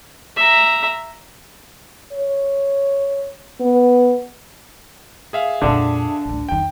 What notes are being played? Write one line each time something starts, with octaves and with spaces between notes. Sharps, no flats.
E5 A#5
C#5
B3
G#4 E5 F5
F2 A#2 D3 D4
A1 D2
F2 D#3 G5